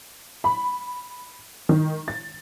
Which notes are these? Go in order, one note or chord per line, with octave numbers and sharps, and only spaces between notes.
B5
D#3
A6